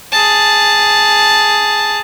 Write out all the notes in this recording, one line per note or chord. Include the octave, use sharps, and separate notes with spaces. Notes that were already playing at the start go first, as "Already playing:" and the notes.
G#4 A5